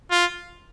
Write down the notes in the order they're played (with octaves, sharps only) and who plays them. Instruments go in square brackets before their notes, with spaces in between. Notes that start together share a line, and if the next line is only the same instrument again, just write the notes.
[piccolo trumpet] F4